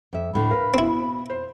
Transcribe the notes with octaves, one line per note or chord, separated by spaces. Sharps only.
F2 E5
D2 A2 D3 B5
A#4 B4 F5
B2 C4 E4
C5